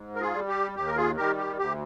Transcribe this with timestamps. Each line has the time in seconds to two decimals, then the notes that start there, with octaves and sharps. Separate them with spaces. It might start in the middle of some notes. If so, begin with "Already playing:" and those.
Already playing: G#2
0.15 A#4
0.21 F4 G#4
0.34 G3
0.48 G4
0.75 D#2 G4
0.87 A#4
0.96 F4 G#4
1.16 D#3 G3 G4 A#4
1.38 G4
1.58 D2 G4